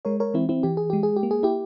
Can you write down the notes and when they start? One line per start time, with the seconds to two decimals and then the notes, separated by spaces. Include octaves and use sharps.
0.05 G#3 A#4 C#5
0.20 A#4 C#5
0.34 E3 C4 E4
0.49 C4 E4
0.63 E3 G4
0.77 G#4
0.90 G#3 G4
1.03 G#4
1.16 G4
1.23 A#3
1.31 G#4
1.43 E4 G4